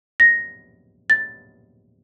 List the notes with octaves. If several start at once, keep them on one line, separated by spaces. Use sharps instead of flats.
A#6
A6